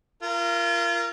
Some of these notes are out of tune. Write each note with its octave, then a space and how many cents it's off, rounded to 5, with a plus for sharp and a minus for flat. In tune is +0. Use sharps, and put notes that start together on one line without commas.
F4 -30 A#4 +0